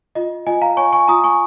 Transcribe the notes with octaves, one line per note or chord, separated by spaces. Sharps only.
F4 D#5
F4 D#5 G#5
F5 A#5
C#5 G#5 C#6
G#5 C#6
F4 A#5 D#6
G#5 C#6